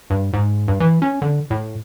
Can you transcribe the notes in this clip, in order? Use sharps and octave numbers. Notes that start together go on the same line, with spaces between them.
G2
G#2
G2
E3
C#4
D3
A2